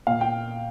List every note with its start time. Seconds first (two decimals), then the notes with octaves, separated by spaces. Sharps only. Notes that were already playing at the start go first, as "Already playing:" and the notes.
0.07 A#2 F5
0.21 G5